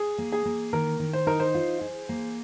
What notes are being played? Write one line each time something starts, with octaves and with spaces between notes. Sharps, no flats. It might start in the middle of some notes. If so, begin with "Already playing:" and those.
Already playing: G#4
A#3
G#4
A#3
D#3 A#4
D#3
C5
D#4 A#4
C5
F4
G#4
A#3